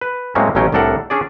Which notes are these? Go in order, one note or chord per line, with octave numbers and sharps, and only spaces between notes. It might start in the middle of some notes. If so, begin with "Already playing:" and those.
B4
A2 F#3 G#3 A#3 C4 C#4
A1 B2 F#3 C#4 G5
C2 A2 D4 A4 A#4 F#5
C#4 D4 G#4 D5